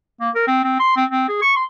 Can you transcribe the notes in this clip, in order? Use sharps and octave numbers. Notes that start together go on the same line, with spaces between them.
A#3
A#4
C4
C4
C6
C4
C4
G#4
C#6
C6